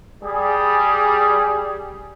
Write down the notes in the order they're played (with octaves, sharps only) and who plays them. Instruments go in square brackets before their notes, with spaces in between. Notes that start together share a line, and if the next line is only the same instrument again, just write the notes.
[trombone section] G3 G#4